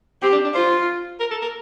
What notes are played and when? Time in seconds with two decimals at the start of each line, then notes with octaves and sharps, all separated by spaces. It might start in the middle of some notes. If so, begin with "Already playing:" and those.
0.22 C4 G4
0.32 D4
0.44 D4
0.55 F4 C5
1.20 A#4
1.31 A4
1.42 A#4